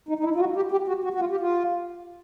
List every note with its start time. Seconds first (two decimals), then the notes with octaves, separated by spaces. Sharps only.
0.09 D#4
0.19 D#4
0.24 E4
0.35 F4
0.40 F#4
0.56 G4
0.72 G4
0.88 F#4
1.04 F#4
1.14 F#4
1.20 F4
1.31 G4
1.41 F4